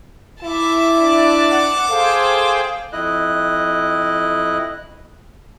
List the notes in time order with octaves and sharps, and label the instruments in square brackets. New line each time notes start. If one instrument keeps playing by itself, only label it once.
[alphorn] E4 [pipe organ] E5 [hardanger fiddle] A5 D6
[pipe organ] D4 D5 [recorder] E5
[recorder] F#5
[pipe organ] G#4 C5 G5 [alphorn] A4 [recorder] F5
[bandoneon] F2 E4 D#5 F#6